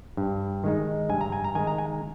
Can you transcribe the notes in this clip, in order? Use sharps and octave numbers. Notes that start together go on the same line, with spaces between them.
G2
D#3 G#3 D#4
G2 G#5
A#5
G#5
A#5
D#3 G#3 D#4 G#5
A#5
G#5